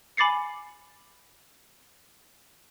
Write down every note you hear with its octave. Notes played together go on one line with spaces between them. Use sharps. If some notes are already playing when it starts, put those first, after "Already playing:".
G#5 B5 D6 A6 C7 C#7